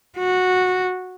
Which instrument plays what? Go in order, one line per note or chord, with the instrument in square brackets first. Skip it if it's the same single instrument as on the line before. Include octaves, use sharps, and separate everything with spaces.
[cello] F#4